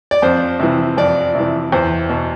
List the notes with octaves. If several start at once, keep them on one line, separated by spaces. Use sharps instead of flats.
D5
F2 C5
C3 E3
F2 D5
C3 E3
E2 C5
B2